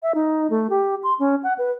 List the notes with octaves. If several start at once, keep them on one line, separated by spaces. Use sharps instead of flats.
E5
D#4
A3
G4
C6
C#4
F#5
B4